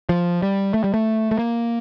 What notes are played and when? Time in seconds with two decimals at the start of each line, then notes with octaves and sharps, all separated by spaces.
0.09 F3
0.42 G3
0.74 A3
0.84 G3
0.94 A3
1.31 A3
1.38 A#3